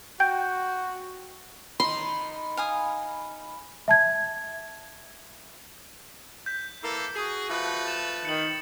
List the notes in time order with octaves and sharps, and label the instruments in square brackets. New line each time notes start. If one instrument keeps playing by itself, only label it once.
[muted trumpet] F#4 [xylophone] G5 G6
[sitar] D#3 D#4 [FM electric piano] B5 [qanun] C6
[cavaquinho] F5 G#5 D#6
[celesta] E5 A5 G#6
[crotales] G6 B6
[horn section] E3 A#3 A4
[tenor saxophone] F#4 [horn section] G#4
[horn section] F3 A3 B4
[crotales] A6 E7
[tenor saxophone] D#3 [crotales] C#7 F#7